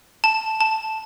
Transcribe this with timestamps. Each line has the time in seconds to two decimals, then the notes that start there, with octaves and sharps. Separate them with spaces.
0.24 A5
0.61 A5